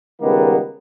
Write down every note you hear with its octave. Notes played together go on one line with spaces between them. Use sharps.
C#2 D#3 G3 G#3 A#3 B3